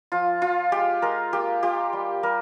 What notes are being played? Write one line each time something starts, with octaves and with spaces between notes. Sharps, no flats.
F3 F4
F3 F4
G#3 G4
G#3 A#4
A#3 G4
F4 G4
G3
G3 A#4